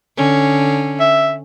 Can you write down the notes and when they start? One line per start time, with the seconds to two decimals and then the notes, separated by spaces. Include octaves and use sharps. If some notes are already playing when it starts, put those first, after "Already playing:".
0.17 D3 C#4
1.00 E5